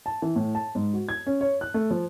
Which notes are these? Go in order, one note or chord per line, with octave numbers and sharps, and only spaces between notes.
A5
E3
A2
A5
G#2
F#4
G#6
C#4
C#5
F#6
A3
F3